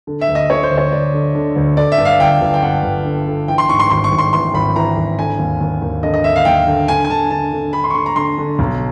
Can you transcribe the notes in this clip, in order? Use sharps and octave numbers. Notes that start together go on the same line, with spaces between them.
D3
E5
D2
D#5
D3 C#5
C5
D2
C#5
D2 D5
D3
D3
D2
D3 D5
E5
G2
F5
G1 G5
G1
G5
G2 F#5
G1
D3
D3
E3 G5
C6
G#2 C#6
C6
G#1 C6
C#6
G#1
C6
E3 C6
G#1 B5
E3 A#5
G#1
D3 G#5
D#2
D#2
D#2
D3 D#5
D#5
D3 E5
F5
D#2 G5
D3
D3 G#5
G#5
D3 A5
D3 A5
D3
D3 B5
C6
C#6
D3 C6
A#5
D3 C6
D3
B1